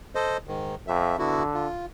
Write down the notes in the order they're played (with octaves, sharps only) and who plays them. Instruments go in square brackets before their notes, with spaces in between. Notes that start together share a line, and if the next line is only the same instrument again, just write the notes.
[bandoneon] A4 C5 D#5
G#2 D#3
[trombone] F2 [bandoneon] E5
[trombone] D3 [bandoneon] B3 E4 F#4
[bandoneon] F4